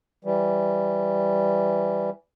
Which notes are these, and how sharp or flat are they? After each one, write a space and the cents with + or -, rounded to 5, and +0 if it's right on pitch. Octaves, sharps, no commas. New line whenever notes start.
E3 +15 G3 +0